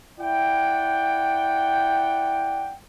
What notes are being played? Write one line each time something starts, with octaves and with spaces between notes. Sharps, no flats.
E4 D5 F#5 G5